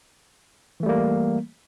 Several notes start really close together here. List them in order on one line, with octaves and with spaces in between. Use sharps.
E3 A3 G3 A#3